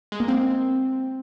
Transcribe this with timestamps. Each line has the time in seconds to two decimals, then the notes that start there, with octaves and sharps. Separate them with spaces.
0.12 G#3
0.20 A#3
0.28 C4